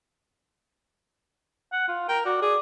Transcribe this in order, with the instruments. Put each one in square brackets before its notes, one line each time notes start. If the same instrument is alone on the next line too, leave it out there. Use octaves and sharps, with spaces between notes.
[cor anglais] F#5
F4
[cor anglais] A#4 [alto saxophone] G5
[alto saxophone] F#4 [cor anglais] D5
[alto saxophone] G#4 [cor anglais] D5